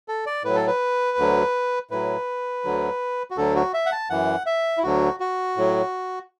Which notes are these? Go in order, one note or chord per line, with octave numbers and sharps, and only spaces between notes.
A4
D5
A2 F#3 B4
A4
B4
D2 D3 F#3
A2 F#3 B4
D2 D3 F#3
F#4
D2 D3 F#3 A4
F#4
E5
F#5
A5
F#2 E3 F#5
E5
E4
D2 D3 F#3 F#4
F#4
A2 F#3